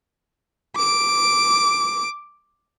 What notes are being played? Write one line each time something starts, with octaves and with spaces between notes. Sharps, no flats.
D6 D7